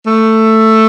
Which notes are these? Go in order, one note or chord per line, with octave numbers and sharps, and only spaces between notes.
A3